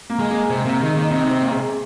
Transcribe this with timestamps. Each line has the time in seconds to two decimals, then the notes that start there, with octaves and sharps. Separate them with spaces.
0.10 A#3
0.19 G#3
0.30 A#3
0.50 C3 C4
0.65 C3 A#3
0.80 D#3 G#3
0.95 D#3 A#3
1.10 C3 D#4
1.30 C4
1.41 A#3
1.51 G#3